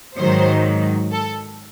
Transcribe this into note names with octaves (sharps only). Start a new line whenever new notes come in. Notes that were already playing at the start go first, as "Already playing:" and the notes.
G#2 D#3 F#3 C5
A4